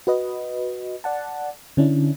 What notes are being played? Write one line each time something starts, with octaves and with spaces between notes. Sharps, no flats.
F#4 B4 D#5
D5 F#5 A5
D3 C#4 D4 E4